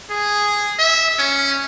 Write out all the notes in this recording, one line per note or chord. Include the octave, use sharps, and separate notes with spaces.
G#4
E5
C#4